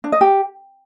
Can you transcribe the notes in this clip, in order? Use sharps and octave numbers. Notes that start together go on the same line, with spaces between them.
D4
D#5
G4